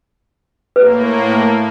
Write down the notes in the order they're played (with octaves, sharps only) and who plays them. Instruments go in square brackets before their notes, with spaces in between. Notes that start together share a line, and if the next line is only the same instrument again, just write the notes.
[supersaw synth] A2 A#3 [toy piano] B4